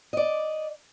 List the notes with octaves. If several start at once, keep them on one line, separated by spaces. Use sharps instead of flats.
D5 D#5